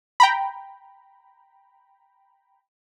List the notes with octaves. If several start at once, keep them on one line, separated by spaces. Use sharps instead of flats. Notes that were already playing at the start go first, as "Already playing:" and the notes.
G5 A#5 B5